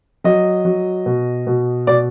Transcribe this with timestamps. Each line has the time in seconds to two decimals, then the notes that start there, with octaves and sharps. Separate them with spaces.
0.24 F#3 D#5
0.65 F#3
1.06 B2
1.47 B2
1.87 B2 D5